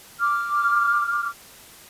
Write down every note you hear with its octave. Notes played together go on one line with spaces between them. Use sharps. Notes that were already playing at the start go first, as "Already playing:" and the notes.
D6 F6